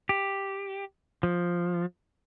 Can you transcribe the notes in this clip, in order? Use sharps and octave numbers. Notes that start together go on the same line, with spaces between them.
G4
F3